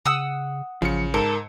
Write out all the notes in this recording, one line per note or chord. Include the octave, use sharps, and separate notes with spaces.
C#3 F#5 D#6 E6
A1 C#3 F3 C#7
G#2 A4 A#4